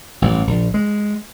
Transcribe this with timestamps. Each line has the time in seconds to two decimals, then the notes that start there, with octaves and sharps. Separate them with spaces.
0.22 A1 G2 E3
0.47 A#1
0.74 G#3